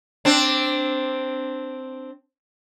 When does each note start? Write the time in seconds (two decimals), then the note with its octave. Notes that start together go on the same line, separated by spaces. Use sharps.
0.25 C4 D4